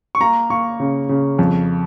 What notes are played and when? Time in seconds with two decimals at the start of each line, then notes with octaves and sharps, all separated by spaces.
0.15 C#6
0.20 A#3 A#5
0.50 A#3 C#6
0.80 C#3
1.09 C#3
1.39 F2